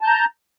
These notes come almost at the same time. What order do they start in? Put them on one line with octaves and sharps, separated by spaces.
A5 G6 A#5